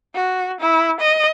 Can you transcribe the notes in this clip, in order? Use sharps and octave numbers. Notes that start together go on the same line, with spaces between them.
F#4
E4
D#5